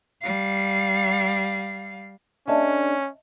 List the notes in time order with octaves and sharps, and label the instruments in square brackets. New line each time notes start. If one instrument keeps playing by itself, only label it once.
[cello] G3 F5
[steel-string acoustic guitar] A#3 D4 G#4 [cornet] C#4 [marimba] D#5 E5 A5